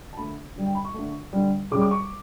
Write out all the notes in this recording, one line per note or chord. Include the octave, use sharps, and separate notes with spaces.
A5
D3 A3 B5
D3 G3
G5
B5
C#6
D3 A3
D3 G3
C#3 G3 D6
D6
C#6